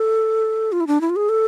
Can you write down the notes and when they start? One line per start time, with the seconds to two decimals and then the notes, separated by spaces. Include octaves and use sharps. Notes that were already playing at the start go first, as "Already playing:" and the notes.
Already playing: A4
0.72 F4
0.80 E4
0.87 D4
1.01 E4
1.10 F4
1.16 G#4
1.29 A4